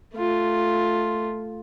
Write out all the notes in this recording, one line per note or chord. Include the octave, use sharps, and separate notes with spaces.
A3 F4